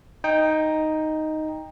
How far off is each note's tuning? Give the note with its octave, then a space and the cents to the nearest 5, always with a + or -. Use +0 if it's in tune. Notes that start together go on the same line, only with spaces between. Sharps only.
D#4 +0 G5 +15